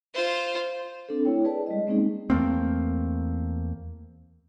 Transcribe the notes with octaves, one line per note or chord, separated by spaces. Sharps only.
F4 C5
C4 D4 A4
A3 E4 C#5 G5
G#4 B4 D5 A5
G3 G#3 D#5
G#3 A#3 C4 C#4 D#4 G#4
E2 A3 A#3 C4